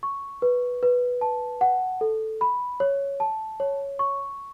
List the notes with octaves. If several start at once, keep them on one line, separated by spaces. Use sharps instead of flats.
C#6
B4
B4
A5
F#5
A4
B5
C#5
A5
C#5
C#6